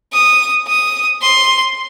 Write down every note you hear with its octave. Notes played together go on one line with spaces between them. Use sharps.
D#6
D#6
C6